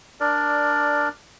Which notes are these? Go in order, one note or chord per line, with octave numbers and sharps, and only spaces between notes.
D4 A#4 D5